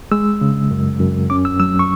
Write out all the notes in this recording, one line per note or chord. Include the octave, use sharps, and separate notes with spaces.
G#3 E6
C#3
F#2
F#2
C#4 D6
E6
F#3 E6
C#6